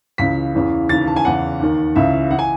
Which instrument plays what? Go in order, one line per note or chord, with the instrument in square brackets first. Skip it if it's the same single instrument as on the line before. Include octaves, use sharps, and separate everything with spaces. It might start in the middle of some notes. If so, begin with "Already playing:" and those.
[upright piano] C#2 C#3 E3 B6
E2 C#3 E3
D#2 C#3 E3 A6
A5
G#5
E2 C#3 E3 F#5
D#2 D#3
C#2 C#3 E3 E5
E3 F#5
G#5